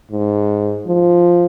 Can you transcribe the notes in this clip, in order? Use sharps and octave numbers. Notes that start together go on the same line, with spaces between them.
G#2
F3